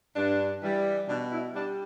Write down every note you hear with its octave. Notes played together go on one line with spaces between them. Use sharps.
G2 D4
E3 G3
B2 D4
E4
G3 D4